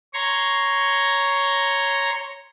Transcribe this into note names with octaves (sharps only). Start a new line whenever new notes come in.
C#5 A#5 C6 C#6